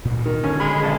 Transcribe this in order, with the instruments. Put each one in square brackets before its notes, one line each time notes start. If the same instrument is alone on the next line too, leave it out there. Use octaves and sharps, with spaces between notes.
[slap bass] D2 A#2
[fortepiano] D#3
[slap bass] D#1 D3 D4 [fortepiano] C#4
[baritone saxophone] G#3 [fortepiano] B5
[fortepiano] B1 A5